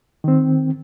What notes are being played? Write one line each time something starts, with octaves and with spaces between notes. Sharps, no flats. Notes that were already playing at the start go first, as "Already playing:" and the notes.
D#3 C4